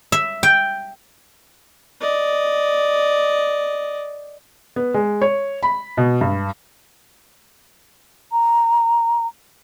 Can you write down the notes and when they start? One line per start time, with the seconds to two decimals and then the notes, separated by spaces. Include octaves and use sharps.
0.12 E5
0.43 G5
2.00 D5 D#5
4.76 B3
4.94 G#3
5.22 C#5
5.63 B5
5.97 B2
6.21 G2
8.32 A#5